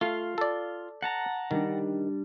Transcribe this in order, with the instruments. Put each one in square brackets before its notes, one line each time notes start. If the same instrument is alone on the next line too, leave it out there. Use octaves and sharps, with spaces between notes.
[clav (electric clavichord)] A3 [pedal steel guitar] F4 F5
[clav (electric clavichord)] A4 D5
[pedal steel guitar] F#5 A5 A#5
[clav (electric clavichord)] D#3 [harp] G3 D4